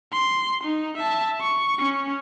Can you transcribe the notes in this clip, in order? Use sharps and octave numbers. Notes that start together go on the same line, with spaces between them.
C6
D#4
E5 A5
C#6
C#4